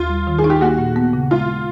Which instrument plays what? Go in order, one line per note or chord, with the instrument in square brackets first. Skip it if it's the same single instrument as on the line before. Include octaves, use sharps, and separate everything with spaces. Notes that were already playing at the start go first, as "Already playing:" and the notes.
Already playing: [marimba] D#2 [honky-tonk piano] F4
[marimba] G3
D#3
[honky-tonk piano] G#4
[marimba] D#4
[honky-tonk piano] G4
[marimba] A#3 [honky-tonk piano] F#4
[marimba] A#2
B3
C#3
[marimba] G#3 [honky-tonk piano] F4
[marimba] G#3